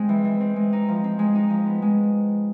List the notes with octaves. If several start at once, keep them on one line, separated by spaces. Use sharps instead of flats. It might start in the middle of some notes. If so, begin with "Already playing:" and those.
Already playing: G#3 C4
E3
E3
C4
G#3
D#4
F3
C4
G#3
D#4
F3
B3
G#3